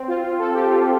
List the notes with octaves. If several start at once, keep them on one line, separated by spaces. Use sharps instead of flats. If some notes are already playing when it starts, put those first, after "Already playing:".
Already playing: C4
F4
F4
A4
G4
F4